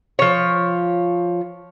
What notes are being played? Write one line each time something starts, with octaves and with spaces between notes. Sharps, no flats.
F3 C#5